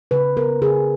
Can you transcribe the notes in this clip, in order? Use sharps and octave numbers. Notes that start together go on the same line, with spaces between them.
C#3 B4
B3 A#4
C#3 G#4